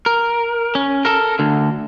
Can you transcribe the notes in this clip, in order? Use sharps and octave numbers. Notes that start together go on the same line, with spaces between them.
A#4
C#4
A4 A#4
D2 D3